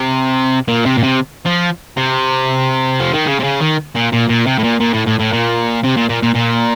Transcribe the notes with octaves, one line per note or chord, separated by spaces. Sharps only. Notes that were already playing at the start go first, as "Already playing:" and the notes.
Already playing: C3
A#2
C3
A#2
C3
F3
C3
F3
D#3
C#3
C3
C#3
D#3
A#2
A#2
A#2
C3
A2
A#2
A#2
A2
A2
A2
A#2
C3
A#2
A#2
A#2
A#2